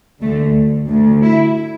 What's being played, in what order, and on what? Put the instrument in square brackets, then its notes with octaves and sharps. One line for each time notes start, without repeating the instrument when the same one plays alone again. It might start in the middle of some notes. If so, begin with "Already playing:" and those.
[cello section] D2 D3 A3
D2 D3
E4